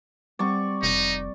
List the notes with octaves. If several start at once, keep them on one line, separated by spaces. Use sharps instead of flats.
G3 C4 D5 C#6
F1 D#4